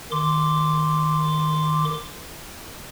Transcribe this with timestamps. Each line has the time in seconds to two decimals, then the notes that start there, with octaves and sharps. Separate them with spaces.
0.11 D#3 C6 D6